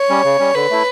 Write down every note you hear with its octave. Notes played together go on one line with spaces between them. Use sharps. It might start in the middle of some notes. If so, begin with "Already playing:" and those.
Already playing: C#5
G3 C#4
C#3
G3 C#4
D3 B4
A3 E4